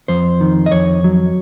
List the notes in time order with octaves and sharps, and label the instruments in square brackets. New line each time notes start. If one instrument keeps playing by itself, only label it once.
[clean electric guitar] F2 C5
D#3
D#5
F2 C#5
F#3